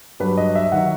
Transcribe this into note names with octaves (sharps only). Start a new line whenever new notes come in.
G2 F#3 B4
D#5
E5
D#3 F#3 F#5